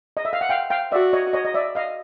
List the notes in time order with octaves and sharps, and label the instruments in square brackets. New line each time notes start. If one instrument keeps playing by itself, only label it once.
[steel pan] D#5
E5
F5
F#5
F5 G5
F5 G5
[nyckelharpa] F#4 [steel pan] D5 E5
[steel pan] C#5 D#5
C#5 D#5
D#5
D5 E5
D#5 F5